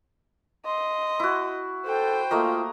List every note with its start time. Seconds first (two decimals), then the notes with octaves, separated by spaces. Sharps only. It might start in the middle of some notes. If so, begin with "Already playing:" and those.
0.66 D#5 C6
1.20 E4 F#4
1.86 A4 C5 G5
2.31 A3 A#3 F4 D#5